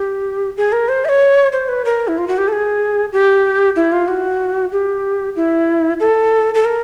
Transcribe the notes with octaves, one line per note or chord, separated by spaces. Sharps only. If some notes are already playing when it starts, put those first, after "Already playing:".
Already playing: G4
G#4
A#4
C5
E5
C#5
C5
B4
A#4
E4
F4
F#4
G4
A4
G#4
G4
E4
F4
F#4
G4
E4
A4
A4
A#4